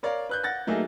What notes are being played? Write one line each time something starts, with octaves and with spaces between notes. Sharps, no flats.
A#4 C#5 D5 F5
B4 F#6 G6
F#5 A6 A#6
F#3 A3 A#3 D#4 F#4 G#4